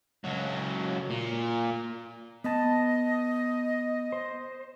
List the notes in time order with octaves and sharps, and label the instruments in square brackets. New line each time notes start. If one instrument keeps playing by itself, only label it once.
[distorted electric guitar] C#2 F#3
A#2
[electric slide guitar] B3 A5 [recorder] D#5
[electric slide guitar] C5